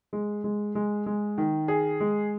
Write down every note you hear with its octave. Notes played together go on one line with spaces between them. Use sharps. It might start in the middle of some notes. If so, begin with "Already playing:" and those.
G#3
G#3
G#3
G#3
D#3
G#4
G#3